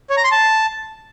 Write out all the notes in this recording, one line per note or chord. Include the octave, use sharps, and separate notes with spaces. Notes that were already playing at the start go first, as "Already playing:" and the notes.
C#5
A#5
C6
A5